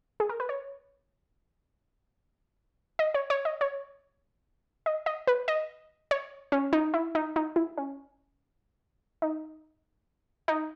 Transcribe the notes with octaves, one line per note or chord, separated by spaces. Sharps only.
G#4
A#4
B4
C#5
D#5
C#5
C#5
D#5
C#5
D#5
D#5
B4
D#5
C#5
C#4
D#4
E4
D#4
D#4
E4
C#4
D#4
D#4